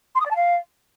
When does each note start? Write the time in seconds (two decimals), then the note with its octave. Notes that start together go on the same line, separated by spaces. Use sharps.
0.15 C6
0.20 D#6
0.25 D5
0.30 A5
0.35 F5